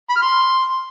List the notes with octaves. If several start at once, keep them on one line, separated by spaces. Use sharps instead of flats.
B5
F6
C6